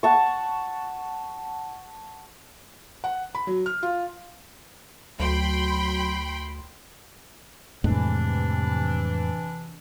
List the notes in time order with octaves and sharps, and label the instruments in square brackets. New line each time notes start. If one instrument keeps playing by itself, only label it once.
[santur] F#5 A5 C#6
[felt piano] F#5
B5
F#3
F6
F4
[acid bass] D2 [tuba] F#3 [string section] G5 B5 C6
[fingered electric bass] F2 A2 G#3 [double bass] C3 [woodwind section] E3 D4